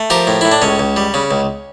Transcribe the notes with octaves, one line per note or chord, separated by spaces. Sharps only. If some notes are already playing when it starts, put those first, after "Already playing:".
Already playing: A3
F3 G4 A#4
A2
A2 E4
D4
C#2 C#4
C#2
G3
C#3
C#2